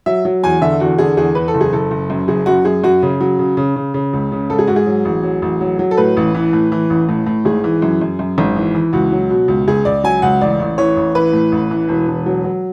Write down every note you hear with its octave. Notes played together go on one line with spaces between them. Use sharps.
F#3 E5
F#3
E2 G#5
D3 E5
E2 F#4
D3 G#4
E2 G#4
E2 B4
A4
F#1
G#4
F#1 A4
F#1
F#2
F#1 G#4
F#2 F#4
F#2 G#4
F#2 F#4
C#3
F#3
C#3
C#3
C#3
C#3
C#2
C#3
G#2 A4
G#4
G#2 F#4
G#4
F#3
A1
F#3
A1
F#3
F#3
A4
A2 B4
A1
E3
A2
E3
A1
A2
A2
G#1 G#4
E3
F#2
F#2
F#2
G#1
E3
E3
C#2 F#4
F#3
B2
C#2
C#2 G#4
C#2 D5
F#3 G#5
C#2 F#5
A1 D5
A1
E3 C#5
A1
E3 B4
A2
A1
E3
E1
E1
F#3
F#3